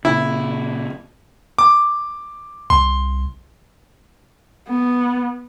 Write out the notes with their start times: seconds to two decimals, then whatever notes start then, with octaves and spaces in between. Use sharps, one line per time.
0.05 A#2 C#3 E4
1.59 D6
2.70 C2 C6
4.69 B3